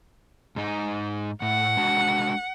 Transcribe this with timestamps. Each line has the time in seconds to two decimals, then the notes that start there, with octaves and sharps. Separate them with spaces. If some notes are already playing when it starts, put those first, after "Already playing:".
0.56 G#2 D#4
1.42 A2 F#5
1.77 G#3 D4 F#4